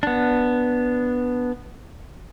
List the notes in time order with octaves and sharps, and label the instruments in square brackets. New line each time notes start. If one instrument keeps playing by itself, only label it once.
[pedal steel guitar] B3 D4